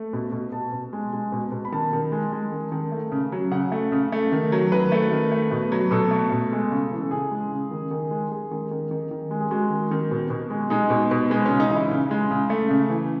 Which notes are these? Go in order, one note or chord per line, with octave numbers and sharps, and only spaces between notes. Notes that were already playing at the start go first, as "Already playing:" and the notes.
Already playing: A3
B2
B2
B2 A5
B2
G#3
G#3
B2
B2
B5
D#3 A5
D#3
G#3
G#3
D#3
D#3
A3
C#3
F#3
C#3 F#5
A3
C#3
A3
D#3
F#3
D#3 B4
A3
D#3
A3
B2
F#3
B2 A4
A3
B2
G#3
C#3
E3
A4
C#3 G#4
G#3
C#3
D#3
D#3
G#3
G#3 G#4
D#3
D#3
D#3
D#3
G#3
G#4
G#3 F#4
D#3
D#3
B2
B2
G#3
G#3 D#4
B2
B2
G#3 B3
C#4
C#3
D#4
E3 E4
C#3
G#3
C#3
A3
C#3
E3